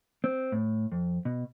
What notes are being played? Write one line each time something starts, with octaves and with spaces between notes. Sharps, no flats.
C4
A2
F2
B2